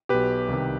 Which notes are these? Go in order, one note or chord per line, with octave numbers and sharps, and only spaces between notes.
B1 B2 G4 B4
C2 C3 D#3